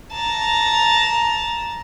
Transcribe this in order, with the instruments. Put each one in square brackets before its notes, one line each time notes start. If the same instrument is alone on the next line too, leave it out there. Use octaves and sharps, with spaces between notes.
[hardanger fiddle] A5 A#5